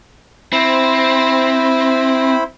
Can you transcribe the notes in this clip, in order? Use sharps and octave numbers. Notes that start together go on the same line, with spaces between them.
C4 E4 C5 B5